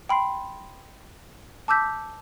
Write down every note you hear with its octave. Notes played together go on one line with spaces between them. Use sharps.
G5 B5 C6 C7
A5 D6 E6 G6 B6